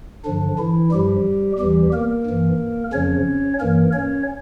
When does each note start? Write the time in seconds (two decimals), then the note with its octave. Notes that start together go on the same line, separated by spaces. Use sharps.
0.24 G2 D3 F3 D4
0.58 E3 E4
0.91 G2 F3 G3 G4
1.58 E2 E3 G3 G4
1.93 A#3 A#4
2.26 G2 E3
2.93 F2 C#3 F3 C#4 C#5
3.60 G2 E3 A#3 A#4
3.93 C#4 C#5